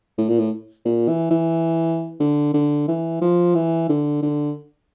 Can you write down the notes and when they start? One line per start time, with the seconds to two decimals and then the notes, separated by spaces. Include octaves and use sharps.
0.18 A2
0.29 A#2
0.39 A2
0.85 A#2
1.08 E3
1.31 E3
2.20 D3
2.54 D3
2.88 E3
3.21 F3
3.55 E3
3.89 D3
4.22 D3